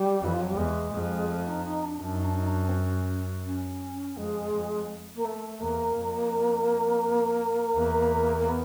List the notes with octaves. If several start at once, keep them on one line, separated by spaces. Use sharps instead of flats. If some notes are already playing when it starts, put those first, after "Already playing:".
Already playing: G3
F2 E3
F3
F#3
G3
E2 G#3
F2
A3
D#4
D#4
D4
F#2 D4
D#4
D4
D#4
D4
C4
C#4
C#4
F2 G#3
F2
A#3
A3
E2 A#3
F2
E2
A#3
B3